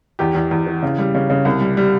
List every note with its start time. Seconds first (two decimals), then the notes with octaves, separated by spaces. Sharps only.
0.19 E2 G4
0.35 E2
0.51 E2
0.67 E3
0.83 C#3
0.98 G3
1.15 C#3
1.30 C#3
1.45 C2
1.61 G3
1.77 G3